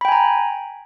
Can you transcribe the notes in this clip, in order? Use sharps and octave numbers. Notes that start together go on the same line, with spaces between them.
G5 G#5 A#5 B5